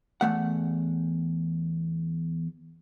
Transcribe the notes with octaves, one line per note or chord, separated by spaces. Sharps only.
E2 A3 F#5